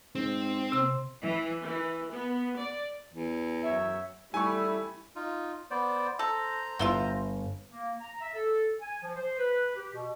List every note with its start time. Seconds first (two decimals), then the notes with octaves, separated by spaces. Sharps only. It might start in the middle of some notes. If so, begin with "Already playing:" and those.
0.15 G#2 C4
0.72 C3 C6
1.22 E3
1.62 E3
2.11 B3
2.56 D5
3.14 E2
3.63 F#2 C#5 E5
4.34 G3 A3 E4 G#5 C#6
5.16 D#4 F4
5.71 B3 C5 D5
6.19 A4 C5 A#5
6.79 G1 B3 E4 F4 G7
7.69 A#3
8.00 A#5
8.21 E5
8.35 A4
8.81 G#5
9.03 F3
9.16 C5
9.38 B4
9.75 G4
9.93 B2